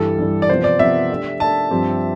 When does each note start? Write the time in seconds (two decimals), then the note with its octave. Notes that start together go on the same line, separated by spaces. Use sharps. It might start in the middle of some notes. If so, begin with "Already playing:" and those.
Already playing: G2 E3 G3 A4
0.19 G2 E3 G3
0.42 D5
0.49 C3 F3 B3 C5
0.64 D5
0.79 C3 F3 B3 E5
1.10 A3 D4 G4 D5
1.40 A3 D4 G4 D5 A5
1.70 G2 F3 C4 G4